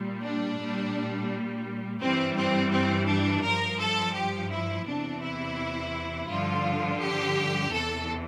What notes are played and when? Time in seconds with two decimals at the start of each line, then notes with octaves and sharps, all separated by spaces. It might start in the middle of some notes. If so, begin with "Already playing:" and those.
Already playing: A#2 G3
0.22 D4
0.57 A#2 G3
2.01 G2 E3 G3 C4
2.37 C4
2.72 C4
3.07 D4
3.43 G2 F3 A#4
3.79 A4
4.14 G4
4.51 E4
4.86 E2 C3 E3 D4
5.22 E4
6.28 G2 D3 F3 F4
7.00 G4
7.71 E2 C3 E3 A4